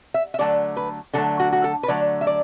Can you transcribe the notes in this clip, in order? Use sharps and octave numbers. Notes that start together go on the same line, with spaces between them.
E5
E5
D3 F#3 A3 D5
B4
D3 F#3 A3 A4
F#4
F#4
A4
B4
D3 F#3 A3 D5
E5
D5